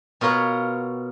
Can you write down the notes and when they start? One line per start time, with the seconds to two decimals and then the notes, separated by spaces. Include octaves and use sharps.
0.21 B2 F4 A#4 C#5 F#5